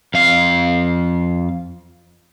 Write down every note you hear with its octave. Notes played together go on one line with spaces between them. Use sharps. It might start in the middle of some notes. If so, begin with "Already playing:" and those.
F2 F5